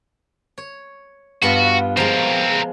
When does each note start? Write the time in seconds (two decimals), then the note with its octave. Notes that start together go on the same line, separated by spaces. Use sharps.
0.58 C#5
1.42 G2 B3 F4 F#4
1.97 F3 G#3 C4 A#4